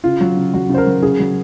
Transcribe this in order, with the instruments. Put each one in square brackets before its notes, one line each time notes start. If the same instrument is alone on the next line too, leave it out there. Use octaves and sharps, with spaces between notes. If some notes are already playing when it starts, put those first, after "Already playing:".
[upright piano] C#3 F4
F#3
C#3
F#3 F#4
C#3 C5
A#4
F#3
C#3 G#4
F#3